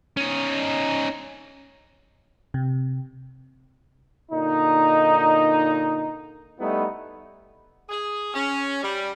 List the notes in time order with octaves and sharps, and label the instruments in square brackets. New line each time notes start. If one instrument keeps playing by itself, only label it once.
[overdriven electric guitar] C#4 D#4
[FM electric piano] C3
[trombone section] A#2 D3 D#4
G3 A3 B3 D#4 E4
[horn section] G#4
C#4
G3